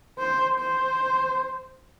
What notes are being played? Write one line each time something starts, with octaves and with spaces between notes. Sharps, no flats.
C5
C5